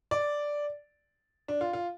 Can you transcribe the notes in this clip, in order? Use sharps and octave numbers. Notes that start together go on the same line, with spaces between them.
D5
D4
F4
F4